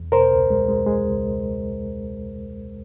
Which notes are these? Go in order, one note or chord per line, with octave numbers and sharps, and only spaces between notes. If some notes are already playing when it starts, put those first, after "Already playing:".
Already playing: E2
B2 A#4 C5
C#2
G#3
G#3
G#3
C#2